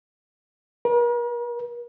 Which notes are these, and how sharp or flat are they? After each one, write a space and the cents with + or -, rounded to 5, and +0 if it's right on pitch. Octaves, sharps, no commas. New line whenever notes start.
A#4 +45